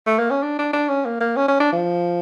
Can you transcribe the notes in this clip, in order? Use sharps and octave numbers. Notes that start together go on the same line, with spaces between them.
A3
A#3
C#4
D4
D4
D4
C#4
A#3
A#3
C#4
C#4
D4
F3